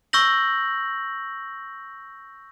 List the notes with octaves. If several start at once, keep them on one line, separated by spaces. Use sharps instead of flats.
C#6 E6 G6 A#6 F#7